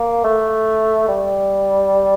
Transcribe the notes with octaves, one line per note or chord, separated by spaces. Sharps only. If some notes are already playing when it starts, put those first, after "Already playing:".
Already playing: A#3
A3
G3